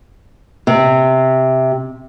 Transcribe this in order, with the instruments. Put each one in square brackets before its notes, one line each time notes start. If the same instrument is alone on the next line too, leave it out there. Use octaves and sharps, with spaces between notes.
[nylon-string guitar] C3